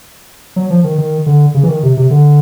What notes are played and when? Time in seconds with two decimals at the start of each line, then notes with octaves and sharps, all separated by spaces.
0.56 F#3
0.70 F3
0.84 D#3
0.98 D#3
1.26 D3
1.54 C#3
1.63 E3
1.69 D#3
1.83 C3
1.97 C3
2.11 D3